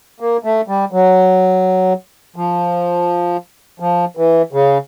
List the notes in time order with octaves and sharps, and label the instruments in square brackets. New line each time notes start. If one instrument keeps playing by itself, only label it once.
[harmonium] A#3
A3
G3
F#3
F3
F3
E3
C#3